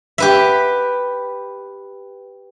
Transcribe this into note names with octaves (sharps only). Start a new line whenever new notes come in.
G4 B4 E5